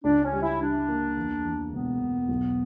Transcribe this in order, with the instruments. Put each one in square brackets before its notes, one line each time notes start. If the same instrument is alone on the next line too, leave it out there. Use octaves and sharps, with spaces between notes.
[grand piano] C#2 [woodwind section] D4
[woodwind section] C#4
[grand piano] G3
[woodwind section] E4
[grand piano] G3 [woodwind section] D4
[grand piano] A#3
E2
E2
[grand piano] E1 [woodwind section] B3
[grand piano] E1
B1